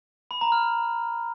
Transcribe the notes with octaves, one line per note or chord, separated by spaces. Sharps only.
B5
A#5
F6